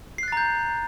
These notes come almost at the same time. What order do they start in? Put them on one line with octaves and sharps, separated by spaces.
C7 F#6 A6 A#5 G6